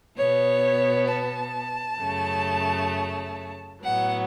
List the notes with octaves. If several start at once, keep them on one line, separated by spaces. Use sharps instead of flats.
B2 B3 C#5
A5
F#2 C#3 A3
A2 F#3 B3 F#5